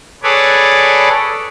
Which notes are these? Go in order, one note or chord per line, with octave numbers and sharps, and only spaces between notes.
G#4 A4 B4 C#5 D5